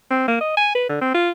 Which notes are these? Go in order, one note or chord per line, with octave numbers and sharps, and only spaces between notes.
C4
A#3
D#5
G#5
B4
D3
C4
F4